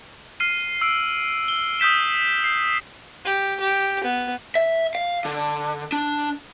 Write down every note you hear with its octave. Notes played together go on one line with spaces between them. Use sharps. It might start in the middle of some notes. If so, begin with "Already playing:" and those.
F6 C7 D#7
E6 D7
G7
D#6 E6 G6 B6 E7
C7
G4
G4
B3
E5
F5
D3
D4